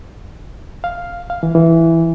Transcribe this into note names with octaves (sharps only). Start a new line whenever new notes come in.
F5
F5
E3
E3